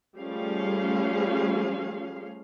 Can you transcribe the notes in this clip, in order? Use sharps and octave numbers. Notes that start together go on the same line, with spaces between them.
F3 G3 A3 C#4 G#4 F5